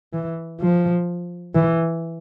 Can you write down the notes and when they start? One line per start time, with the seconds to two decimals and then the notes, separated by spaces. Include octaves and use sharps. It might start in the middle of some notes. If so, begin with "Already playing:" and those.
0.13 E3
0.61 F3
1.55 E3